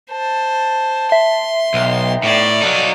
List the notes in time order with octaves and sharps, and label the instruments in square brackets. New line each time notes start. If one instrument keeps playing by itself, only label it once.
[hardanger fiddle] C5 [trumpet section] A5
[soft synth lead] E5 [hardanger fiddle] C6
[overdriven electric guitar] B1 [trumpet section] B3 D#4 G5
[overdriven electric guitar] A2 [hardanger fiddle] D5
[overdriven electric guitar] F#3 D#4 [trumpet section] A4 F5